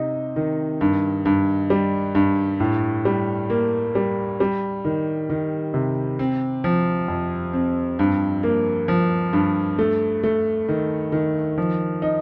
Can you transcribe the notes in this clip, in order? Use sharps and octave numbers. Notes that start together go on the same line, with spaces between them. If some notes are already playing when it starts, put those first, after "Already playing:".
Already playing: C3 D#4
D#3
G2
G2
G3
G2
A2
G3
A#3
G3
G3
D#3
D#3
C3
C4
F3
F2
C4
G2
A#3
F3
G2
A3
A3
D#3
D#3
F3
D#4